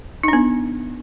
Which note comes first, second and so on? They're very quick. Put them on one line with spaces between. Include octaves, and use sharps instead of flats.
D#4 D4 B3